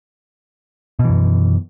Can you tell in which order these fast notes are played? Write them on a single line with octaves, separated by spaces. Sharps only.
B2 E3 F#2